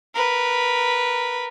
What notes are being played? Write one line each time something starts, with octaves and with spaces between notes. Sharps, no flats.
A#4 B4